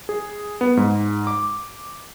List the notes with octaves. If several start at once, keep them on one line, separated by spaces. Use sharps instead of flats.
G#4
B3
G#2
D6